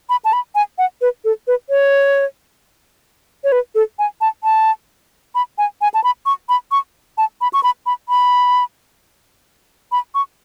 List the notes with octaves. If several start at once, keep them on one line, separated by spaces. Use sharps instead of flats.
B5
A5
B5
G#5
F#5
B4
A4
B4
C#5
C#5
B4
A4
G#5
A5
A5
B5
G#5
G#5
A5
B5
C#6
B5
C#6
A5
B5
C#6
B5
B5
B5
B5
C#6